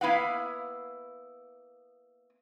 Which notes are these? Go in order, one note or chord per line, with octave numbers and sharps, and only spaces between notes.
A#3 B3 E4 F5 F#5